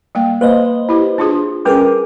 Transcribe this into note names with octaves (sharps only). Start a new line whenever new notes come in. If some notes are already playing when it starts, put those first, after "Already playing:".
G3 A#3 G5
A#3 B4 C5 D#5
E4 G4
D4 F4 G#4
G3 C#4 G#4 A#4 B4 D6